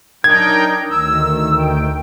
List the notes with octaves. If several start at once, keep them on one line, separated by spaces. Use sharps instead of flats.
F#3 D4 D#4 A#4 G5 G#6
D2 D#3 E6
G5